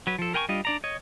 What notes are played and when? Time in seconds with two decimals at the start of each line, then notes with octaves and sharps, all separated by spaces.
0.07 F#3 B4
0.19 F3 A4
0.34 A#4 G5 G#5 C6 C#6
0.49 G3 D4 F4 D#5
0.65 D4 D5 A#5
0.84 C#5 D#5